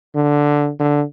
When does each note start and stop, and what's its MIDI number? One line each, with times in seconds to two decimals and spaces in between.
0.15 0.70 50
0.79 1.03 50